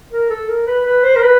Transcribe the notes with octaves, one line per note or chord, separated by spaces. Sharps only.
A#4
A4
A#4
B4
B4
C5
A#4
B4